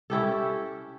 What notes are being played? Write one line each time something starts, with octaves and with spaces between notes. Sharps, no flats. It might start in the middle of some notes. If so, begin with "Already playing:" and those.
C#4 E4 G4 A4